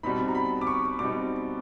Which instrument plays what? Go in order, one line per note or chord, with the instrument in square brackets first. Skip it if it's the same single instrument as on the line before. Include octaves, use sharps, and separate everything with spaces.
[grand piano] B2 G3 C4 D#4 B5
A#5
B5
D6
C#6
B2 G3 C4 D#4 D6